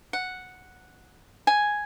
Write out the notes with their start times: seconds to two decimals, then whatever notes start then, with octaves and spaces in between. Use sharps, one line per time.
0.13 F#5
1.47 G#5